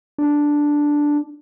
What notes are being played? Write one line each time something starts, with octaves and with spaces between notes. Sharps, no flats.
D4